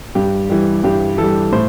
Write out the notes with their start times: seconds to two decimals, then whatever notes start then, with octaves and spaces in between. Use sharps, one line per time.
0.15 G2 G4
0.49 E3 G3
0.84 G2 G4
1.18 E3 G3 A4
1.52 A2 C5